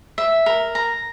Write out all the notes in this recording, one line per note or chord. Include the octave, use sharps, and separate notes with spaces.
E5
A#4
A#5